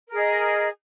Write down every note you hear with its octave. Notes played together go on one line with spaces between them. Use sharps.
G#4 A#4 D#5